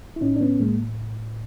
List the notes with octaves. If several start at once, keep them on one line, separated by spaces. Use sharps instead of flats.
E4
A2 C#4 D#4
D4
B3 C#4
A2 G#3 A#3